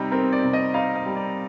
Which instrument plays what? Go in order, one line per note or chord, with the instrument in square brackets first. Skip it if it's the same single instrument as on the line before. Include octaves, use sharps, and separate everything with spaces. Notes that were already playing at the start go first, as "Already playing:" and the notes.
Already playing: [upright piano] C3 G3 C4 D#4
C4 A#4
D5
C3
D#5
D#4 F5
D#5
G3
D5